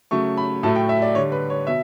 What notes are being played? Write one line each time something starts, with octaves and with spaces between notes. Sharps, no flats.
C#3 F#3 A3 C#6
B5
A2 F#3 A3 A5
G5
E5
D5
D3 G3 C#5
B4
C#5
B2 E5